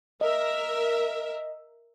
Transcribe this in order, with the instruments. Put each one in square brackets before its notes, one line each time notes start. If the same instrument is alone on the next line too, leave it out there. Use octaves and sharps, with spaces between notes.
[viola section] A#4 E5 [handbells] D#5